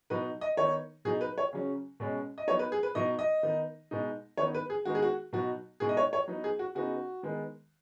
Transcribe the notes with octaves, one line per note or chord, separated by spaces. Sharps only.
B2 F#3 D#4 B4
D#5
D#3 B3 D#4 C#5
B2 F#3 D#4 G#4
B4
C#5
C#3 F#3 C#4
B2 G#3 C#4
D#5
F#3 B3 D#4 C#5
B4
G#4
B4
B2 F#3 D#4 D#5
D#5
D#3 B3 D#4
B2 G#3 D#4
D#3 B3 D#4 C#5
B4
G#4
D#3 G#3 B3 D#4 F#4
G#4
F#4
B2 F#3 D#4 F#4
B2 G#3 D#4 G#4
D#5
C#5
C#5
F#3 B3 D#4
G#4
F#4
C#3 B3 D#4 F#4
D#3 G#3 B3